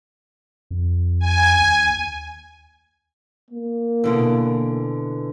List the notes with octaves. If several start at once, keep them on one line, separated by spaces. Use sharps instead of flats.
F2
G#5
D#2
A#3
B2 D3 E3